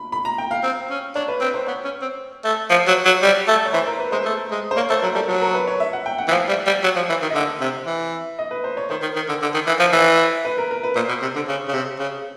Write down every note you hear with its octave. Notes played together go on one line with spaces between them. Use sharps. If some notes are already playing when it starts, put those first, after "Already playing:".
Already playing: B5
B5
A#5
G5
F5
C4
C#4
D4 C#5
B4
C4 B4
C5
B3 C#5
C#4
C4
A3
F3
F#3
F#3
G3
A3
C#5
E3 C5
A#4
B4
G#3 C5
A3
G#3
C5
A#3 C#5
A3 C5
F#3 A#4
G3 A4
F#3 A#4
A#4
B4
C#5
E5
F#5
G5
F#5
E3
F3 F5
G3
G3
F#3
F3
E3
D#3
D#5
D3 E5
C3
E3
D#5
B4
C5
C#5
D#3 C5
D#3
D#3
D3
D3
D#3
E3
F3
E3
B4
A#4
A#4
B4
A#2 C5
B2
C3
D3
C#3
C#3
C3
C#3